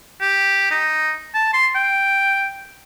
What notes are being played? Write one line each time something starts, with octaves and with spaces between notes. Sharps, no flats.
G4
D#4
A5
C6
G5